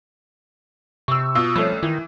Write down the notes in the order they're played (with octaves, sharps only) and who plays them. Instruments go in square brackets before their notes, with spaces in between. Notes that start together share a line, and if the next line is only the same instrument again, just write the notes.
[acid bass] C3 [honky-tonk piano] C#6 E6
[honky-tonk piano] B2 F4 E6
[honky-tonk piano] C2 A3 C#4 [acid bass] F3
[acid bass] D#3 [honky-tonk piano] E3